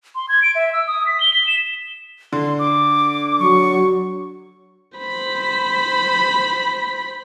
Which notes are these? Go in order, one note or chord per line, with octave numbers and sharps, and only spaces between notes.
C6
G#6
D7
E5
E6
D#6
B6
G7
B6
E7
D3 C6
D6
F#3 C#6
C5 B5